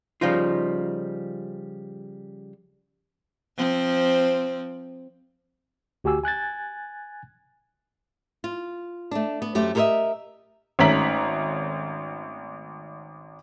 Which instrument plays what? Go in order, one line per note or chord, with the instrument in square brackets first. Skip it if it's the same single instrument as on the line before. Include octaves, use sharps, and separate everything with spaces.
[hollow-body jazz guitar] C#3 F3 G3 D#4 F4
[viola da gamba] F3 C4
[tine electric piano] D2 F#4 G4 G#5 E6
G#5 F#6 G#6 A6
[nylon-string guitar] F4
A3 D4
B3
F#2 A3 G4 C5
G4 A4 A#4 C5 D#5 E5
[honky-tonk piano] G#1 A3 C#4 A#5 B6 F#7